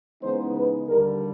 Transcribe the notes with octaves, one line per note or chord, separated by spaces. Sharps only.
C#3 E3 G#3 B3 D#4 C5
B4
D#2 D3 G3 A#4